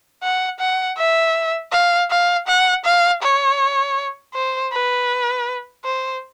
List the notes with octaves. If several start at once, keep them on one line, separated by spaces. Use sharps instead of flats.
F#5
F#5
E5
F5
F5
F#5
F5
C#5
C5
B4
C5